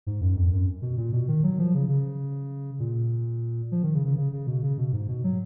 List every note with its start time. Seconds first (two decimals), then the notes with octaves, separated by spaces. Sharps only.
0.07 G#2
0.21 F#2
0.36 F2
0.52 F#2
0.82 B2
0.97 A#2
1.13 B2
1.28 D#3
1.43 F#3
1.59 F3
1.74 C#3
1.88 C#3
2.80 A#2
3.72 F3
3.83 D#3
3.94 C#3
4.05 C#3
4.17 C#3
4.33 C#3
4.47 B2
4.63 C#3
4.78 B2
4.93 G#2
5.08 B2
5.24 F#3